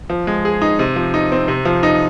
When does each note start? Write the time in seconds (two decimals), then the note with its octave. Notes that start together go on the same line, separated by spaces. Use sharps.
0.10 F3
0.27 G#3
0.45 G#4
0.62 D#4
0.79 C3
0.96 F3
1.14 D#4
1.32 C4
1.48 C3
1.65 F3
1.83 D#4